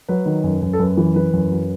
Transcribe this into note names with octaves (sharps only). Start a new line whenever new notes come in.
F#3 B4
D#3
F#2
F#2
A4
F#2 B4
E3
E3 B4
F#2
F#3